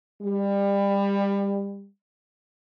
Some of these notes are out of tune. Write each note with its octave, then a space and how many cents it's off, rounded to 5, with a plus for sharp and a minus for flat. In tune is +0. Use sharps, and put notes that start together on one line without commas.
G3 +25